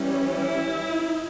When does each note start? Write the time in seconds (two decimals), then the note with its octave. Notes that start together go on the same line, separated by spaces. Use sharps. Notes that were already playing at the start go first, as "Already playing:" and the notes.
Already playing: E3 G3 C#4
0.32 E4